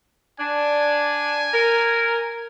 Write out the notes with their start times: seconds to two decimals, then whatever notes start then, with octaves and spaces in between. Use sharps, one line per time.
0.40 D4 G#5
1.54 A#4